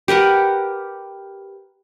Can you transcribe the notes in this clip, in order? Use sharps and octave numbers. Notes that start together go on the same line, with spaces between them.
G4 A#4 B4 F#5